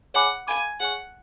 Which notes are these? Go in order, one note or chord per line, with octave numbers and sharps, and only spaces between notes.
G#4 C#5 F#5 G#5 B5 D6
A4 F5 G#5 B5 D6
G#4 C#5 F#5 G#5 C#6